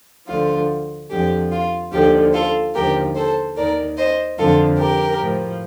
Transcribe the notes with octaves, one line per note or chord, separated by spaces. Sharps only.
D2 D3 F3 F4
F2 D3 F3 G4
F4
D#2 D3 F3 G4
F4 A4
D#2 D3 F3 G4 A#4
A4 C5
D#2 D#3 A#4 D5
C5 D#5
F2 D3 F3 F4 A4
G4 A#4
A2 F3